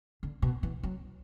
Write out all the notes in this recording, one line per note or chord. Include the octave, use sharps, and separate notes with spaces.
D3
B2
E3
F#3